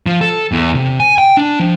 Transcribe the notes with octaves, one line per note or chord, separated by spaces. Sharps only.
F3
A4
E2
C3
G#5
G5
D4
F3